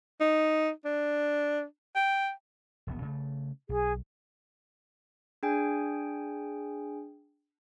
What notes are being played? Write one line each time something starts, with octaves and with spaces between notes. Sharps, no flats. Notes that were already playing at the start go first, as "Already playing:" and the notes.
D#4
D4
G5
E1 A#1 B3
C#3 A3
B1 G#4
D4 G#4 G5 G#5